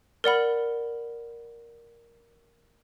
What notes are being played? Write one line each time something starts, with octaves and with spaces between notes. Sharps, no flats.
A#4 D5 F#5 B5